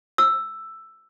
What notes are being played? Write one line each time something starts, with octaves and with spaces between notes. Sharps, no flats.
E6